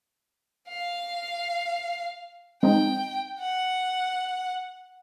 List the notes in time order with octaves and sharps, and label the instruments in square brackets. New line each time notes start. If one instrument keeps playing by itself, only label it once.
[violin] F5
[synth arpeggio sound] G#3 C4 D#4 [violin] G5
[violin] F#5